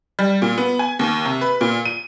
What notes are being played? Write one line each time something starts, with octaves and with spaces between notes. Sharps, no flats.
G3
A#2
B3
G#5
D#2
C3
B4
A#2
D#7